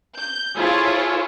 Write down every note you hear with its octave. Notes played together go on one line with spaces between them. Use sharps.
G6
E4 F4 G#4 A4 C5 C#5